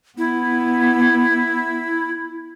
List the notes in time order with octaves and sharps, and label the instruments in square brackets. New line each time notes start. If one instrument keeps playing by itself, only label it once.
[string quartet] B3 [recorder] E4